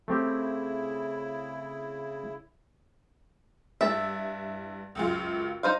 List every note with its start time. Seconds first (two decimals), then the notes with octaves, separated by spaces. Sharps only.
0.08 C#3 A3 C4 E4 G4
3.81 G2 E4 E5 A6
4.95 C#2 F#2 F4
5.63 D#4 C5 F5